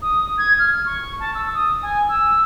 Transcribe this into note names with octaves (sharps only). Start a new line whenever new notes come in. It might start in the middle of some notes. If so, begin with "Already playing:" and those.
D#6
G#6
F6
C#6
A5
E6
D#6
G#5
E6